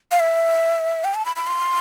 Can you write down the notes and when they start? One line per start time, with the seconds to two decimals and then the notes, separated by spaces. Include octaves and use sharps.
0.11 F5
0.20 E5
1.04 G5
1.15 A5
1.25 B5
1.36 B5
1.47 C6